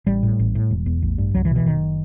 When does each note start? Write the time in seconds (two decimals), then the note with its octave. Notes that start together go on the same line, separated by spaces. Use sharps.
0.07 A1 G3
0.23 A2
0.39 A1
0.55 A2
0.71 E1
0.86 E2
1.02 A1
1.18 G2
1.35 C2 F#3
1.45 E3
1.51 B2
1.56 E3
1.66 F#1 D#3